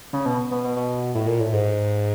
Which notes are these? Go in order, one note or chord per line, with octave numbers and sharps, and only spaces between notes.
C#3
B2
B2
B2
B2
A2
A#2
A2
G#2